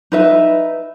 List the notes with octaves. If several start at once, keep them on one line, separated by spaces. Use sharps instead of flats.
D#4 B4 E5